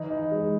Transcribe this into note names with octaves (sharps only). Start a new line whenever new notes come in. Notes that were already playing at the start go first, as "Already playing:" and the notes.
Already playing: E3 D#4
D#4
G#3